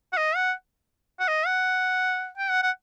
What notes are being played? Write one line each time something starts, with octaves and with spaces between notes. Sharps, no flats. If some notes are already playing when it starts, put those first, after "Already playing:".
F#5
D#5
F#5
F#5
D#5
F#5
G5
F#5
F#5